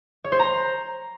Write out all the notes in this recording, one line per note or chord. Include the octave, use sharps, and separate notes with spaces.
C#5
C5
A#5